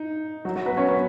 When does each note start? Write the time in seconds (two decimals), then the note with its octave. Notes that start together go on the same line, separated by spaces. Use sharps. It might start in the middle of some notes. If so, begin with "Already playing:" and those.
Already playing: D#4
0.45 F#3 F#4
0.55 F#3 F#4
0.66 B3 B4
0.77 C#4 C#5
0.88 B3 B4